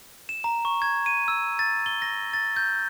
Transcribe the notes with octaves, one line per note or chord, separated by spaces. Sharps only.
E7
A#5
C#6
G#6
D#7
E6
A6
G7
A#6
A6
G6